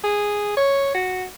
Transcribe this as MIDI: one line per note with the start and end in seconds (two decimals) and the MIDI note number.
0.04 0.57 68
0.57 0.94 73
0.94 1.25 66